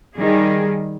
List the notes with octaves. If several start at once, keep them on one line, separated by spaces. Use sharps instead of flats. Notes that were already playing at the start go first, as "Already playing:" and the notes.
D#3 G3 G#4